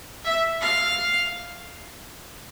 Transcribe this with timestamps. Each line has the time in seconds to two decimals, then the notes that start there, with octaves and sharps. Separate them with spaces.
0.24 E5
0.61 F5